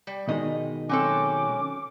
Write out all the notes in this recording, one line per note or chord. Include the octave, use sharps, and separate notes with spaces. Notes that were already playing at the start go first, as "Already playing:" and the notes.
G3
B2 D#3 G#3 D#5
F#3 C4 C#4 A4 D6